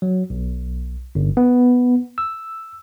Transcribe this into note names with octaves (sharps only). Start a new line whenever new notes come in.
F#3
B1
G1
B3
E6